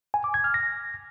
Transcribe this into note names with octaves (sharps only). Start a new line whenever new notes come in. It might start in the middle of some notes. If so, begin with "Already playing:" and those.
G#5
D6
G#6
F6
A#6